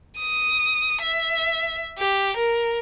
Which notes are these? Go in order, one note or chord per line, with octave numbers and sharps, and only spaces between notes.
D#6
E5
G4
A#4